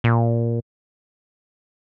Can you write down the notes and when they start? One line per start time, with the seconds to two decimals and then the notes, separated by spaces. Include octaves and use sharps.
0.04 A#2